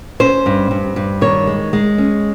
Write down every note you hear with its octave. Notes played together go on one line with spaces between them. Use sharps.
C#4 C5
G2
G2
G2
D#3 C#5
G#3
G#3
C#4